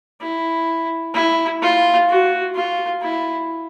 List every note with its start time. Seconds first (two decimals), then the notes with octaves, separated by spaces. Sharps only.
0.21 E4
1.14 E4
1.62 F4
2.09 F#4
2.55 F4
3.02 E4